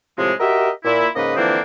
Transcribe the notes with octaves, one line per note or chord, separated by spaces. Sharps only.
A2 C3 F3 G#3
F#4 G4 A#4 D#5 E5
A#2 E4
G#2 C#3 A#3 B4 D#5
D3 E3 F3 A#3 C4 D4